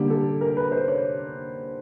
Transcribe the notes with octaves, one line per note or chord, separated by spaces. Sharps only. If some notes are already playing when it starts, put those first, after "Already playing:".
Already playing: D3 G3 A#3 G4
A4
A#4
B4
C5
C#5